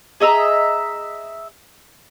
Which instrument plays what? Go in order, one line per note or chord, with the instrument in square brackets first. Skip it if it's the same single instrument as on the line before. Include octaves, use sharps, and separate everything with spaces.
[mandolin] G#4 D#5 E5 A#5